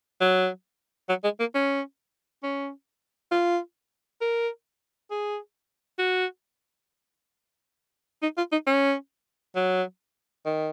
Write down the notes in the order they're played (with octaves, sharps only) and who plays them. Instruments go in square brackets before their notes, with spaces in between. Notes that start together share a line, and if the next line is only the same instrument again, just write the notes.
[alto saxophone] F#3
F#3
G#3
A#3
C#4
C#4
F4
A#4
G#4
F#4
D#4
F4
D#4
C#4
F#3
D#3